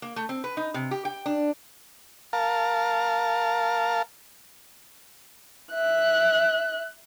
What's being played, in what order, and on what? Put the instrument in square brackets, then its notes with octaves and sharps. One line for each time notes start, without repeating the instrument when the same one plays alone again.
[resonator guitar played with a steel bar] A#3
A3
C4
B4
D#4
C3
G4
G5
D4
[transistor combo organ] A#4 F5 A5
[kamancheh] E5 F#6